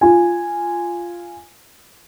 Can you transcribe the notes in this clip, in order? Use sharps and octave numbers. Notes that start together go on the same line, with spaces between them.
F4 G#5